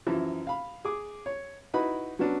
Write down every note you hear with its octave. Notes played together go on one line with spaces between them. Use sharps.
F#2 E3 F3
F5 B5
G#4 D6
C#5
D#4 E4 F#4 B4 B5
F#3 B3 C#4 D4